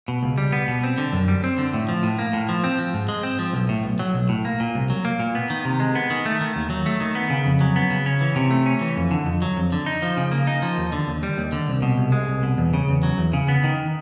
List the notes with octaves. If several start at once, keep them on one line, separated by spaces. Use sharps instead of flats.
B2
C#2
G3
B3
B2
C4
D3
F#2
G3
C4
D3
A2
F3
A2
A#3
A2
F3
C4
F3
G#2
G#3
C4
F3
B1
A2
B1
F#3
B1
A2
A#3
A#2
C2
F#3
A#3
A#2
B3
D#3
C3
G#3
B3
D#3
A3
D#3
D#2
F#3
A3
D#3
B3
C#3
F2
F#3
B3
C#3
C#4
E3
C3
A3
C#4
E3
F2
D3
F2
F#3
F2
D3
D#4
F3
C#3
A#3
D#4
F3
D#2
D3
D#2
G3
D#2
D3
C2
B2
C2
G#3
C2
B2
E2
C#3
E2
F#3
E2
C#3
B3
D#3